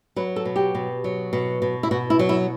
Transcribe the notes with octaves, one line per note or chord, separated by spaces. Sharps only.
F#3 B4
A4
B2
G4
B2
F#3
B2
B2
E4
B2 F#4
E4
F#3
E4